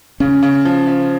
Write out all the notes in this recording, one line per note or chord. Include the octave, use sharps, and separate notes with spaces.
C#3 C#4
C#3
F3
F3